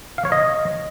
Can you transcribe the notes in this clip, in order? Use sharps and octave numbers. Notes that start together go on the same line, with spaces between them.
F5
C#5
D#5